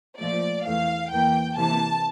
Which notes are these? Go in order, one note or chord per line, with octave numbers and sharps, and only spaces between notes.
A#2 F3 A3 D5
E2 E3 A3 F5
E2 E3 A#3 G5
C3 E3 A#3 A5